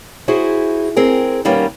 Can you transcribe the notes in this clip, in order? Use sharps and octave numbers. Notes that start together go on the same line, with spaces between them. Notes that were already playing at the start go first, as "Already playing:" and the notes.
E4 F#4 G#4 C5
C4 G#4 A#4
B2 D#3 G3 A#3 B3 C#4